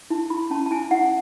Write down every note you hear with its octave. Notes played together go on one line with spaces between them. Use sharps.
E4 A5
E4 B5
C#4 A5
A5
E4 G#5
E4 F#5